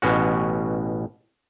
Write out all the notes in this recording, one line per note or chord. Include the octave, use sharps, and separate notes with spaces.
A1 B2 C#4 F#4